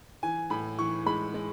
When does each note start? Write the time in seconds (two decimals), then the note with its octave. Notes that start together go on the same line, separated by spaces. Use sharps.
0.23 E3 G#5
0.50 A2 B5
0.79 E3 C#6
1.06 G#3 B5
1.34 G#3